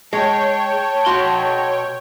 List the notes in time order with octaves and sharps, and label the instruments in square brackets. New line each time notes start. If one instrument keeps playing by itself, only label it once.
[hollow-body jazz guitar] G#3 [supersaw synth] C#5 G5 [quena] A5
[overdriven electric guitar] B2 C6 [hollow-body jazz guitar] F#4